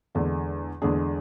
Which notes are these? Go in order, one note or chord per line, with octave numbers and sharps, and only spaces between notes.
E2 D3 G#3 D4
E2 D3 G#3 D4 G#4